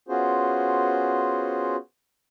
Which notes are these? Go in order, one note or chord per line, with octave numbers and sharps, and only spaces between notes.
B3 C#4 F4 F#4 G#4 C5